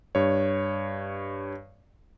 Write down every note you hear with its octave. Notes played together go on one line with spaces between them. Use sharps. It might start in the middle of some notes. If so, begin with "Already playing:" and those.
G2 C#5